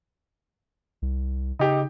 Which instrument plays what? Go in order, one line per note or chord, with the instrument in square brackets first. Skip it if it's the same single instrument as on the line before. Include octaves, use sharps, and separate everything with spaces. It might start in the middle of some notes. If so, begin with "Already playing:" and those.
[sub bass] C2
[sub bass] C#3 [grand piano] D#4 G4